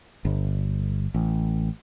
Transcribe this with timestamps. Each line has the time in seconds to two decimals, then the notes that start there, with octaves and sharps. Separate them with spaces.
0.25 G1
1.14 A1